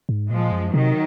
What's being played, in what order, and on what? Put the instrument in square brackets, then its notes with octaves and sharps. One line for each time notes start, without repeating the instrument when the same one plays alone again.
[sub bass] G#2
[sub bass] A#2 [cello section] F3 G#3
[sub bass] F#2
[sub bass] C3 [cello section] D#3 F#3